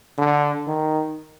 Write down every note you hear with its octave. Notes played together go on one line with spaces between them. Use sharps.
D3
D#3